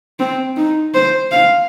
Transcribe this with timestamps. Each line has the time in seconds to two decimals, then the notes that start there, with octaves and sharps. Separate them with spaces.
0.19 C4
0.57 D#4
0.94 C5
1.31 F5